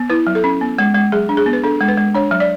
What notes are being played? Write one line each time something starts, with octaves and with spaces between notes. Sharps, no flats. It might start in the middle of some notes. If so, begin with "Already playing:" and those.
Already playing: B3
E4 B4
F#3
A4
C#4
B3
G#3
G#3
F#3 G#4
D4
G#4
B3
B4
D4 A4
G#3
B4
G#3
D4 C#5
F#3
D5